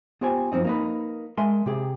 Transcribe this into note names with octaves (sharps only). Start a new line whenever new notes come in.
B3 F4 G4 C5 G5 G#5
F#2 F3 F#3 C4 D#4
A#3 D#4 B4
G#3 A#4 E5 G#5 C6
C3 G4 G#4